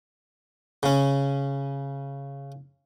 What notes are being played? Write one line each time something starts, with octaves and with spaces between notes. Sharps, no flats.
C#3 C#4